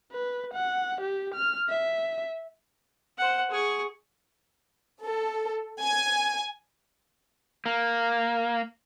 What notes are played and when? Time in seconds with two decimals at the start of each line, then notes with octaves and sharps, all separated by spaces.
0.12 B4
0.54 F#5
1.01 G4
1.35 F6
1.69 E5
3.17 C5 F#5
3.50 G#4 C#6
5.03 A4
5.81 G#5
7.66 A#3